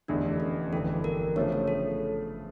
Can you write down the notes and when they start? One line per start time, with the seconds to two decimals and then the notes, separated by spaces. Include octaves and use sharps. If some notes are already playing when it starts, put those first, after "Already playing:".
0.08 F1 E2 D3 A3 D4
0.40 C#4
0.73 G1 F2 E3 A4
1.04 A#4
1.36 C#3 F3 A3 D4 C#5
1.52 C#5
1.68 A4